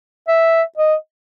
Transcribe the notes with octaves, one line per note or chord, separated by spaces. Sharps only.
E5
D#5